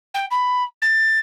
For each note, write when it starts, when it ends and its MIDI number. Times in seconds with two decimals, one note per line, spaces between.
0.14 0.25 79
0.31 0.63 83
0.82 1.19 93